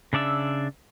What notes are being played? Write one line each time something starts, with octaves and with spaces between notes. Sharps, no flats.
C#3 D4 D5 E5 E6